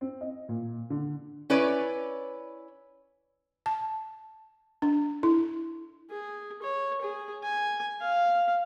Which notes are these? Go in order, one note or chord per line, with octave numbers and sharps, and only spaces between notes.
C4
D#5
A#2
D3
C#4 E4 B4 C#5 D5
A5
D4
E4
G#4
C#5
G#4
G#5
F5